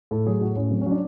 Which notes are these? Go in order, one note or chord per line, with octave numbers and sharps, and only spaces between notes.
A2 A4
F#3 G#4
A2 F#4
A2 C#4
F#3 C4
C#4
F#3 D4